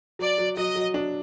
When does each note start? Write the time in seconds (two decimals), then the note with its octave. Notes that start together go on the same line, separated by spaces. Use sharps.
0.19 F#3 D5
0.38 F#3
0.57 F#3 D#5
0.76 F#3
0.94 D4